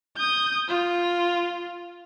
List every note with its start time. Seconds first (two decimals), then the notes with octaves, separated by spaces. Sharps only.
0.16 D#6 G6
0.69 F4